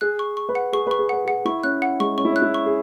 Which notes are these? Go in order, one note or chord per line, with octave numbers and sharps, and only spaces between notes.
G#4 F#6
C#6
C#6
B4
F#5
G#4 C#6
B4 C#6
G#4
B4 F#5
G#4 F#5
E4 C#6
C#4 F#6
F#5
G#3 C#6
C#4 C#6
E4
C#4 F#6
E4
C#6
G#4